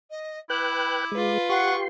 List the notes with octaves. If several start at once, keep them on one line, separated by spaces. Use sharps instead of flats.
D#5
E4 B4 G5 D6 F#6
G#3 F4 B4
G4 F#5 C6 C#6